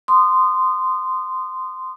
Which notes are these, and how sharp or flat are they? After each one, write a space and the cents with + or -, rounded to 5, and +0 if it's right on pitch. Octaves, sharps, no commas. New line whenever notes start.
C6 -15 D#6 -25